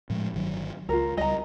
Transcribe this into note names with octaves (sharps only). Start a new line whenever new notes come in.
A2 F3 G#3
G1 D#3 F#3
C#2 F4 A#4
C#2 G3 D#5 A#5